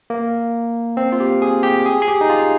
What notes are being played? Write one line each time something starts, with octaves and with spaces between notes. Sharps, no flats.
A#3
C4
F4
G4
G#4
G4
G#4
G#4
G4
D#4
F4